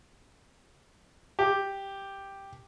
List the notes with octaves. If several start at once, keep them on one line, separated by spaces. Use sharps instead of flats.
G4